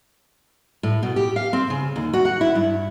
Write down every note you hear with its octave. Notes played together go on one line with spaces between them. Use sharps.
A2
B2
G4
F5
C4
C#3
D#2
F#4
F#5
E4
G2